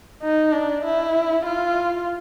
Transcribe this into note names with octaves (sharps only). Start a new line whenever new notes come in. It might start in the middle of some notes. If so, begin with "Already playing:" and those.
D#4
D4
E4
F4